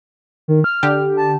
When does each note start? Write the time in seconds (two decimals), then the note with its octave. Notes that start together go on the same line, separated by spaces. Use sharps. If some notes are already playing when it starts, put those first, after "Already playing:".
0.48 D#3
0.64 F6
0.83 D3 G4
1.17 A5